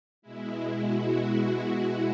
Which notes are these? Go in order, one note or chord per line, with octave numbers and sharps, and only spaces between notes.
B2 G#3 E4
F#4